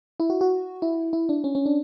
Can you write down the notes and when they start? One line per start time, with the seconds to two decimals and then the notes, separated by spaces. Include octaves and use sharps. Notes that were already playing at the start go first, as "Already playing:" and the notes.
0.20 E4
0.30 F#4
0.41 F#4
0.82 E4
1.13 E4
1.29 D4
1.44 C#4
1.55 C#4
1.66 D4